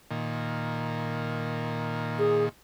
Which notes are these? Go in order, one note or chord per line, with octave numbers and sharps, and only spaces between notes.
A#2 D#3
G#4